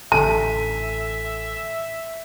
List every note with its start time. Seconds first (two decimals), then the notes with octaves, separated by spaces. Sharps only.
0.12 A1 A2 D3 A4 E5 G#5 A5